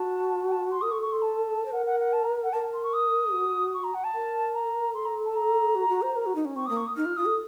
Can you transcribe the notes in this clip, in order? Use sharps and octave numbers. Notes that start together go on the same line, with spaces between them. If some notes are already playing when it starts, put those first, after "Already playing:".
Already playing: F#4 A5
F#5
A5
C6
A#4 D#6
A4 C#6
C#6
C6
A5
C5
A#4 F#5
F#5
F#5
A5
A#5
F#5
A#4 A5
C6
C#6
D#6
F#4
C#6
A#5
F#5
A5
A#4
A#5
A4 C6
A#5
A5
A#5
F#4
F#4
C5
A#4
F#4
D#4
C#4
C4 C#6
A#3 D#6
C#6
D#6
D#4 F6
F4
F4 D#6
A4